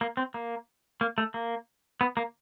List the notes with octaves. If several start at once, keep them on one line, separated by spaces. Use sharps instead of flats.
A#3
C4
A#3
A#3
A3
A#3
B3
A#3